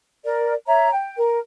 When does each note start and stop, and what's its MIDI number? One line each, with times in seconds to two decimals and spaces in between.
0.24 0.53 70
0.24 0.53 74
0.66 0.89 73
0.66 0.89 76
0.66 0.89 82
0.91 1.16 79
1.17 1.39 70